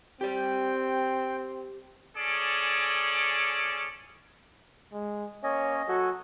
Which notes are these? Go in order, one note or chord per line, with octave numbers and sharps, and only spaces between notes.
C4 G4 D5 G5
C#4 G#4 A4 D5
G#3
A#3 C#4 C#5 D#5 G#5
F#3 F#4 A4 G#5